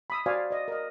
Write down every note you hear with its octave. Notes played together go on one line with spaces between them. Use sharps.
B5 D#6 E6
F#4 C5 D5 F5 G#5
D5 D#5
A#4 D#5